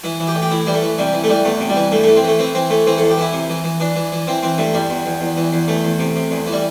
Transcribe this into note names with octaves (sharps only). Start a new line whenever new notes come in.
E3 E4
E3
G4
A2
G4
A2 E4
E3 G3
A3
E3
C3 G3
E3
A3
E3 G3
E2 A3
C3
G3
E3
G2 A3
E3 A3
C4
E3
A3
E3 C4
E3 C4
E3 A3
E3 C4
E2 A4
G4
E3 E4
C3
E3
E3
E3 D4
E3
E3
E3 C4
E3 C4
G2 A3
E2 G3
E2
E2
E2
E3
E2
E2 A3
E2
C3
C3
E2
E3
G3